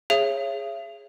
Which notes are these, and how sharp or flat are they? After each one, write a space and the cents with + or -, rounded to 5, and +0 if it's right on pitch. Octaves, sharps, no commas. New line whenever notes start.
G#4 +0 C#5 -15 E5 +45